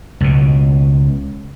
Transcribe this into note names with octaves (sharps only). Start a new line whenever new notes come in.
C#2 B2